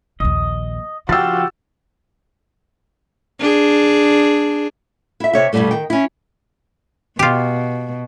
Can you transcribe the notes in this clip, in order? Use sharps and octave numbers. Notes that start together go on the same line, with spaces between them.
A#1 D#2 D#5
C#3 F3 F#4 G4 F5 G5 E6 A6
D4 G#4
E4 E5
C3 C#5 E5
G2 B2 D3 F#3 G3 A3
D#3 G5
C#4 E4
B2 F4 G4